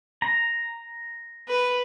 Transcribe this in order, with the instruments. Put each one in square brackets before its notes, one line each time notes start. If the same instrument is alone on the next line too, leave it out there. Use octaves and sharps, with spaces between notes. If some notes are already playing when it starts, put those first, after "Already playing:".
[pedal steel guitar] A#5
[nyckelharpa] B4